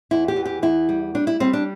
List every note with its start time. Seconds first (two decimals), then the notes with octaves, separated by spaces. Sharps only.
0.11 E2 E4
0.28 G4
0.36 E3
0.45 G4
0.62 E2 E4
0.89 G3
1.15 G3 D4
1.27 E4
1.40 G3 C4
1.53 D4